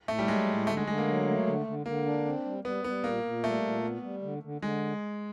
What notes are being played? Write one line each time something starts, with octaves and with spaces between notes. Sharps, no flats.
A2 A3
G3
F#3 G#3
A2
D3 A3
G#3
D3 G#3
A#3
F#3
A3
D3
D3
D3 A#3
D4
C4
G3
G3 B3
G3 B3
A#2 A#3
A#2
G3 A3
A#2
B3
G3
D3
D3
D3 G#3